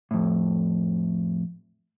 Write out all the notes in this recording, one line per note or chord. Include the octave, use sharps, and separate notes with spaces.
F2 A2